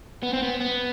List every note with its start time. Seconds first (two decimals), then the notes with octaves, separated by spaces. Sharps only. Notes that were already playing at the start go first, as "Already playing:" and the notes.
0.23 B3
0.33 C4
0.43 B3
0.61 B3